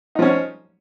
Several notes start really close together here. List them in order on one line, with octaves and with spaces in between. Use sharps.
D#4 F3 C#4